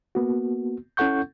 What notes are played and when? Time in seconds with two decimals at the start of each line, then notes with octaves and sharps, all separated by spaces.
0.15 A#3 B3 F#4
0.97 C#4 E4 A4 F#5 C#6 G6